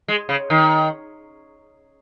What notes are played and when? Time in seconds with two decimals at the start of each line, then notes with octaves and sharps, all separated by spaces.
0.08 G#3
0.29 C#3
0.50 D#3